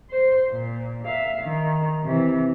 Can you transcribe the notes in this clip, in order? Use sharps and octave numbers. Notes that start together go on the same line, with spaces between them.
C5
A#2
E5 F5
D#3
C3 E3